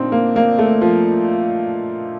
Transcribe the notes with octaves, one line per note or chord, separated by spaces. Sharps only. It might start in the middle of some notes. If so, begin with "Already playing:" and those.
Already playing: A#2 C4 D4 D#4
A#3
A#3
A3
F3